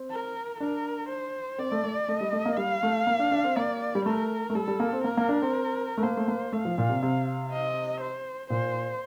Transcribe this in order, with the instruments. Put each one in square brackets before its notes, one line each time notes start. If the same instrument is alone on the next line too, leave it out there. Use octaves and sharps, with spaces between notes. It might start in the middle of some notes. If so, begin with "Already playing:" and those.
Already playing: [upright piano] C4
[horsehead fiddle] A#4
[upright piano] D4 [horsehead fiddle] A#4
[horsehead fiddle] C5
[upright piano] C4 [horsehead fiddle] D5
[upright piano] A3
A3
[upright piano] A3 [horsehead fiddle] D#5
[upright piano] G3
A3
A#3
[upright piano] G3 [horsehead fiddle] F5
[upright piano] A3
A#3
D4
D4
C4
[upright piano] A#3 [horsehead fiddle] D5
[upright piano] G3
[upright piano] A3 [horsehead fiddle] A#4
[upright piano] A3
[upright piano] G3 [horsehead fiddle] A4
[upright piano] G3
A#3
C4
[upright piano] A#3 [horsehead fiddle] A#4
[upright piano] A#3
D4
C4
A3
[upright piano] A#3 [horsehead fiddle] C5
[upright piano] A3
A#3
[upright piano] A3 [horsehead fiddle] F5
[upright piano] F3
A#2
C3
C3
[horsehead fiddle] D#5
C5
[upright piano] A#2 [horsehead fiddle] C5